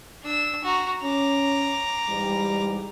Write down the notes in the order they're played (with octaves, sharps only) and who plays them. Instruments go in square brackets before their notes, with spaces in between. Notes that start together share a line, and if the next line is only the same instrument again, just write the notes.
[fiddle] D4 E6
F#4 A#5
[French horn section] C#4 [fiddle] A#5 D6
[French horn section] G#2 E3 G3